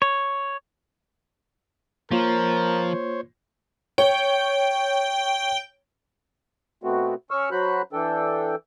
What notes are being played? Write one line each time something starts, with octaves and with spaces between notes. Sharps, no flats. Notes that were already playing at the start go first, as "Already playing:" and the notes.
C#5
F3 A#3 F4 A#4 C5 C#5
C#5 G5
B2 A3 B3 C4 F#4
C#4 C#6 E6 F6
F#3 F#4 C5 B5 F#6
E3 D4 A4 G5